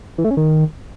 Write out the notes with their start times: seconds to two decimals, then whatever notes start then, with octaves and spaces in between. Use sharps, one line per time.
0.18 E3
0.24 A3
0.31 C#4
0.37 D#3